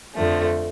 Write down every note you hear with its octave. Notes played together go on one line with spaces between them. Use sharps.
F2 D3 F3 A3